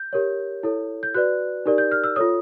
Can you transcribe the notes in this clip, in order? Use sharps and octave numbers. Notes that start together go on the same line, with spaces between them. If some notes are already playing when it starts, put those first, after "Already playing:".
Already playing: G6
G4 A#4 C#5
E4 A4 C#5
G6
F#4 B4 D5 F#6
D#4 G4 A#4 D5
G6
F6
E6
F4 A4 C#5 D#6